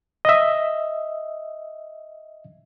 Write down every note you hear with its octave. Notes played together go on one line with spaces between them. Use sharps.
D#5 E5